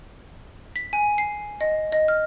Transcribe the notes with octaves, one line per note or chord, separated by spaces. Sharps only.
B6
G#5
C7
D#5
D#5
F6